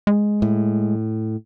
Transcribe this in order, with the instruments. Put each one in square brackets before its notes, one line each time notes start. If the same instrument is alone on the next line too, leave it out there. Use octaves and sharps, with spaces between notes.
[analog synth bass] G#3
[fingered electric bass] A2